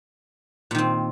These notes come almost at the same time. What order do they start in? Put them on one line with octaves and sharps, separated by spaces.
A#2 D#3 C4